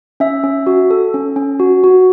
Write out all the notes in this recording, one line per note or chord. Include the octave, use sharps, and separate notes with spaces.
C#4 E5
C#4
F#4
A4
C#4
C#4
F#4
F#4